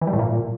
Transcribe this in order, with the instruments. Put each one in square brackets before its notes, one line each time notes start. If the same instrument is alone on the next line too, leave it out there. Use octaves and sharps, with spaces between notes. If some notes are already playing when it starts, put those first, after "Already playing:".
[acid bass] E3
G3
A2
A#2